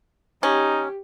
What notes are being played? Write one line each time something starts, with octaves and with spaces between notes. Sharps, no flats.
C#4 D#4 G4